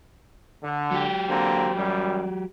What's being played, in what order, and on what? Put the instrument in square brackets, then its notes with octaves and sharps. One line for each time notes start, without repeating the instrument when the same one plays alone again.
[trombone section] D3
[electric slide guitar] F#3 G4
[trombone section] D3 A#3 C4
F#2 G3